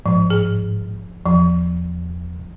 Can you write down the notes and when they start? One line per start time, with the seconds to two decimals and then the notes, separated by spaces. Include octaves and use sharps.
0.06 G#2 F3
0.30 G#4
1.26 E2 F3